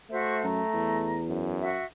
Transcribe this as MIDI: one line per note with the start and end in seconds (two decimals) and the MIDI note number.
0.10 1.21 57
0.10 0.42 66
0.10 0.42 72
0.10 0.42 76
0.43 0.62 42
0.43 1.23 82
0.74 1.65 40
1.28 1.79 42
1.61 1.85 66
1.61 1.85 76